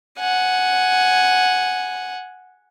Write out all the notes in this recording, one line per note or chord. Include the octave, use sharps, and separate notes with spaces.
F#5 G#5